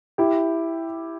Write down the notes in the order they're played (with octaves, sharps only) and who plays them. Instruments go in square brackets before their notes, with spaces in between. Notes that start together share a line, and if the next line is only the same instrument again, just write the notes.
[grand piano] E4 G4